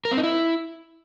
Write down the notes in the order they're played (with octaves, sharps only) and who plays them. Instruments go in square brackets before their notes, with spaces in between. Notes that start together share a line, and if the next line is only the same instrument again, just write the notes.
[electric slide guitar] A#4
C4
D#4
E4